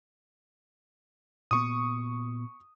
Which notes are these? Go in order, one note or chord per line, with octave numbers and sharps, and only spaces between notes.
A#2 B3 C#6 D#6